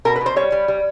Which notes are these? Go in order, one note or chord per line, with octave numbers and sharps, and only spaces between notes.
B2 A#4
B4
B2
C5
G3 C#5
G3
G3